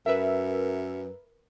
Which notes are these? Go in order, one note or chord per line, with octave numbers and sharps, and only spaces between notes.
F#2 A#4 B4 E5